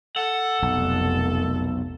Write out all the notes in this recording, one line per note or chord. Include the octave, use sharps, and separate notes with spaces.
A4 F#5
F1 B1